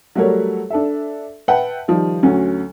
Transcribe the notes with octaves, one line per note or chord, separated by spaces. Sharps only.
F#3 G3 A3 A4 A#4 C#5
D4 A4 E5
B4 E5 F#5 G5 A5
D#3 F3 G3
D2 F#3 C#4